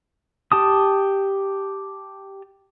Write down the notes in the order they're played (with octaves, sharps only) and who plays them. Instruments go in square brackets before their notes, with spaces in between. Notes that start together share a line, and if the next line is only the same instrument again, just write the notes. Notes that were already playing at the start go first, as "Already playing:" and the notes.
[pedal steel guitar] G4 A5 D#6